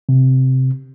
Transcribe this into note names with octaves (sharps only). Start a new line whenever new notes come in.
C3